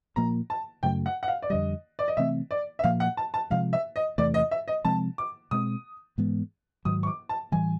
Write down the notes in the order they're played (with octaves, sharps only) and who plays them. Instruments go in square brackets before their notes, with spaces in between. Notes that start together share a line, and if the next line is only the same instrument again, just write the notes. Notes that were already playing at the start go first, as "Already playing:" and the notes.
[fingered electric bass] A#2 F3 A#3 [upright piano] A#5
[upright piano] A5
[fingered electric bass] F#2 C#3 F#3 A3 [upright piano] G5
[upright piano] F#5
F#5
F5
D5
[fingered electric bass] F2 D3 G3 [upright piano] D#5
[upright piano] D5
D#5
[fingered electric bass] C3 E3 A3 C4 [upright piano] E5
[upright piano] D5
E5
[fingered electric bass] A#2 F3 A#3 [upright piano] F5
[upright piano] F#5
A5
A5
[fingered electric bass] C3 F3 G#3 [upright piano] F5
[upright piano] E5
D#5
[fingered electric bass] E2 C3 E3 A3 [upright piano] D5
[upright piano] D#5
E5
D#5
[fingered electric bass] C3 F3 G#3 C4 [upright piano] A5
[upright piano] D6
[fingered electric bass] B2 G#3 C4 [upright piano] D#6
[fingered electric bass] G#2 E3 G#3 B3
[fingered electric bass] G#2 D#3 F#3 [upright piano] D#6
[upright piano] C#6
D6
A5
[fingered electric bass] A2 E3 G3 [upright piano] G#5